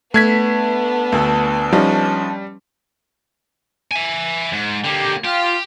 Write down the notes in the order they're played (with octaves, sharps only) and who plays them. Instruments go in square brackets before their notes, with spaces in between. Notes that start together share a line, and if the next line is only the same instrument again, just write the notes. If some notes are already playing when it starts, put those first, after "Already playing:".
[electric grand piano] A3 G#6 B6 [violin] B3 [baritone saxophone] D4
[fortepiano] D2 A4
[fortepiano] F3 C#4 D#4 [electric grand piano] G3
[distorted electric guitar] E5 G#5
G#2
[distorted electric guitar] D3 A#3 [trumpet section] G4
[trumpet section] F4 [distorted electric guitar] G4